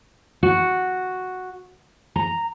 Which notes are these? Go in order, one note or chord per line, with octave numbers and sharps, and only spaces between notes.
F#4
A#5